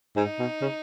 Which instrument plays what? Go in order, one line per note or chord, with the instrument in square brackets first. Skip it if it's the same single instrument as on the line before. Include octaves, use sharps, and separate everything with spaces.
[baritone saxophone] G#2 [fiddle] D#4
[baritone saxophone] B2
C#3